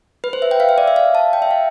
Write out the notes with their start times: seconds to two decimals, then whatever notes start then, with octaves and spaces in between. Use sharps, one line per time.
0.24 B4
0.33 C5
0.42 E5
0.51 G5
0.60 F5
0.69 E5
0.78 D5
0.88 E5
0.96 F5
1.15 A5
1.33 G5
1.42 E5
1.51 F5